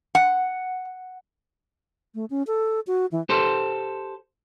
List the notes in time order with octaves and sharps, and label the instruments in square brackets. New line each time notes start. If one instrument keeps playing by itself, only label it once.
[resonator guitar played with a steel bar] F#5
[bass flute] A3
C#4
A4
F#4
E3
[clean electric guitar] G4 A4 C5